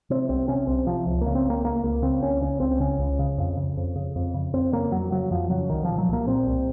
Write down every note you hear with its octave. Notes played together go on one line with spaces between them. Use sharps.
C3 C4
C2 C4
C3 C#4
C2 C4
C3 F3
C#2
C#3 A#3
C4
C#2
A#3
C#3 A#3
C#2 A#3
C#3 C4
C#2 C#4
C#3 C#4
C#2 C4
C#3 C#4
C#2
C#3
F2
C#3
F2
C#3
F2
C#3
F2 C4
C#3 A#3
F2 F#3
C#3 F#3
F2 F3
C#3 F#3
C2 D#3
A#2 F3
F#3
C2 A#3
A#2 C4
C2